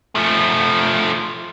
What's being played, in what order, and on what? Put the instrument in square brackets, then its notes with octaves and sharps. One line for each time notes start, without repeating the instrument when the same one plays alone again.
[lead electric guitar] F3 A3